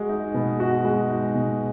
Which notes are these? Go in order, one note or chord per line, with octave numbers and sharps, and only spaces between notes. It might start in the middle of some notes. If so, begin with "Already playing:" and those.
Already playing: G#3 F#4
D#4
B2
F#4
G#3
D#4
B2